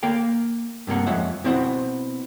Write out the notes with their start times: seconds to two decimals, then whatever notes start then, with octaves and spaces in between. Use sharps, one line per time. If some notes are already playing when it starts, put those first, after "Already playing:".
0.03 A#3 A#4 F5 G5
0.87 G2 C3 A#3 F#5
1.07 F2 G#3 C#5 E5 F#5
1.44 B2 C4 E4 C5 F#5